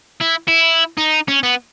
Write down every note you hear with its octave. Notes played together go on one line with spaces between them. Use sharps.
E4
E4
D#4
C#4
B3